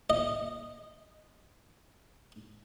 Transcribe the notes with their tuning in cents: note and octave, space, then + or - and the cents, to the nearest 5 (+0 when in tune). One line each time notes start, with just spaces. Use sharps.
D#5 -10